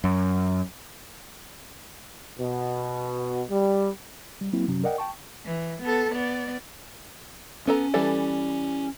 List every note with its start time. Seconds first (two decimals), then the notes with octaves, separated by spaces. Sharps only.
0.04 F#2
2.39 B2
3.51 G3
4.41 G3
4.53 F#3 A#3 C4 E4
4.67 F#2 C3 F#3 C#4
4.84 A#4 D5 D#5 F#5 G5
4.98 G5 A5 C#6
5.45 E3
5.82 B3 A4
6.12 B3 D5
7.67 B3 C#4 A4 A#5
7.94 E3 G3 A4